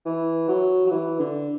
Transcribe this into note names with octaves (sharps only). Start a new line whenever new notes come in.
E3
F#3
F#3
E3
D3